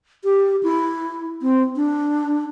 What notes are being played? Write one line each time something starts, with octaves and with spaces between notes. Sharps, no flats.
G4
E4
C4
D4